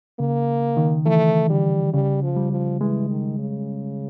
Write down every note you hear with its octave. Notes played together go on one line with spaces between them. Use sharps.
C#3 A#3
D#3
E3 A3
D3 G3
C#3 G3
F3
G3
F3
E3 G#3
D#3
C#3